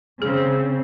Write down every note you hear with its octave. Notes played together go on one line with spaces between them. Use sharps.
C#3 C4 G#4